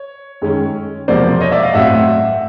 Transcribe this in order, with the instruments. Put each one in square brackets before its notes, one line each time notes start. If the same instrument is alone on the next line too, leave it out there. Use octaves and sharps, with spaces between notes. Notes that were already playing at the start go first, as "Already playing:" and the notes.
Already playing: [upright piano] C#5
F#2 D#3 G#3 C#4
E1 E2 C3 F3 A#3 C5 D5
C#5 D#5
D5 E5
D#5 F5
A1 A2 F#3 A3 C4 E5 F#5